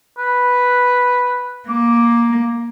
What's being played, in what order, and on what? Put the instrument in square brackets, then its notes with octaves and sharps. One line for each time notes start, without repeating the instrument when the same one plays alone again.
[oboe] B4
[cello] A#3 [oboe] D6